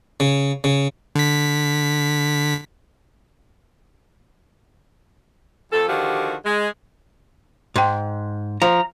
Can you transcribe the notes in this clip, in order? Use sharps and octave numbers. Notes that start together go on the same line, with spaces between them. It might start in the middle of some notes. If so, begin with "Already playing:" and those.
C#3
C#3
D3 B6
F2 A4
D3 D#3 F3 F#4 G4
G#3
G#2 G5 C6
F3 A#5